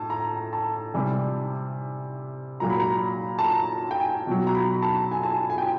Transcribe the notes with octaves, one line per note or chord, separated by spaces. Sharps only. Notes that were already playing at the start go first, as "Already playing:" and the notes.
Already playing: A2 A5
A#5
A5
C3 E3 G3
A#2 F#3 A#5
B5
A#5
A5
A#5
G5
G#5
B2 F#3
A#5
B5
A5
G#5
A5
G#5
G#5
G5